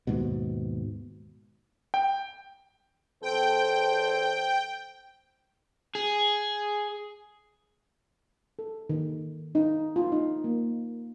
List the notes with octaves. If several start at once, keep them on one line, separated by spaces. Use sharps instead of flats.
D#2 G#2 B2
G5
E2 A4 C5 G5
G#4
A4
D#3
D#4
F4
D#4
A#3